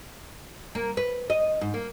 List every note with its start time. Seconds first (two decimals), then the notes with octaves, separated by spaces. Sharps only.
0.75 A#3
0.97 B4
1.30 D#5
1.61 G#2
1.74 A#3